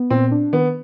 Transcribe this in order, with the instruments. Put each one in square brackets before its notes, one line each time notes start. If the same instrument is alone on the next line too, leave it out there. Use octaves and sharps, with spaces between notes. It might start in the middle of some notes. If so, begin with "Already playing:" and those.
Already playing: [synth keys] B3
[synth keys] A#2 [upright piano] C4
[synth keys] D4
[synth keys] D#3 [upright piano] B3